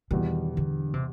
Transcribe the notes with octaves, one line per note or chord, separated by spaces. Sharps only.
E2 B2 D#3 G3
D3
C3